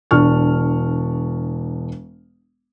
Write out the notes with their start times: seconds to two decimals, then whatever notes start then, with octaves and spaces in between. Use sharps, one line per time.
0.11 E1 D4 C#6 F6